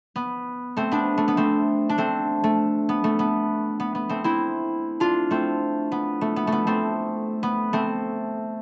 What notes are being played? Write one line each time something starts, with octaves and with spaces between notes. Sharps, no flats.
B3
A3 C4
B3 D4
A3
B3
A3 C4
D4
A3 C4
A3
B3
A3
B3
B3
B3
A3 C4
C4 E4
D4 F4
A3 C4
B3
A3
B3
A3
B3
A3 C4
B3
A3 C4